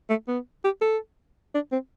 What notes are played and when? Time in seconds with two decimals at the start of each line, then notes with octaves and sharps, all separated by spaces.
0.10 A3
0.28 B3
0.64 G4
0.82 A4
1.55 D4
1.72 C4